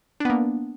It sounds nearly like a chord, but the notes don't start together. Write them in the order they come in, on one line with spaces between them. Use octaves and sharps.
D4 B3 A#3